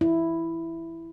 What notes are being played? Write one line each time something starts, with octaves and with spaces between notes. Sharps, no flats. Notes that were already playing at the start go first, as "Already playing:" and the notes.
E4